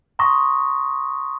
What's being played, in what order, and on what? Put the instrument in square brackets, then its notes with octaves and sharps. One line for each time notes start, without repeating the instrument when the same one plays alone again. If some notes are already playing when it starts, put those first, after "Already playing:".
[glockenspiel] A#5 C6 C#6 D#6 A#6